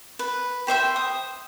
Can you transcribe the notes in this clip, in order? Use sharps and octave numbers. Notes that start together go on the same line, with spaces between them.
B4
G4 C5 E5 G5
D#6